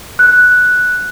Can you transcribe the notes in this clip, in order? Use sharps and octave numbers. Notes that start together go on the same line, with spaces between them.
F#6